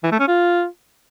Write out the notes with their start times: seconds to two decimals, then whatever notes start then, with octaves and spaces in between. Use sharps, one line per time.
0.03 E3
0.12 A3
0.20 C#4
0.28 F4